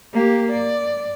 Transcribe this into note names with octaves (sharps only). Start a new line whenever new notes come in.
A#3 G4
D5